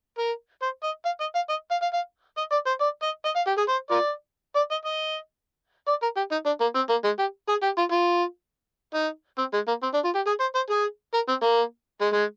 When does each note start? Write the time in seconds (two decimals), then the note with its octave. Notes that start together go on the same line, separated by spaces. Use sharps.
0.18 A#4
0.62 C5
0.83 D#5
1.05 F5
1.21 D#5
1.35 F5
1.49 D#5
1.71 F5
1.82 F5
1.93 F5
2.38 D#5
2.52 D5
2.67 C5
2.81 D5
3.03 D#5
3.25 D#5
3.36 F5
3.47 G4
3.58 G#4
3.69 C5
3.91 F4 A#4 D5
4.56 D5
4.71 D#5
4.85 D#5
5.88 D5
6.03 A#4
6.17 G4
6.32 D#4
6.46 D4
6.61 A#3
6.75 C4
6.89 A#3
7.04 G#3
7.19 G4
7.49 G#4
7.63 G4
7.78 F4
7.92 F4
8.94 D#4
9.38 C4
9.54 G#3
9.67 A#3
9.83 C4
9.94 D4
10.04 F4
10.15 G4
10.27 G#4
10.40 C5
10.55 C5
10.70 G#4
11.14 A#4
11.28 C4
11.43 A#3
12.01 G#3
12.13 G#3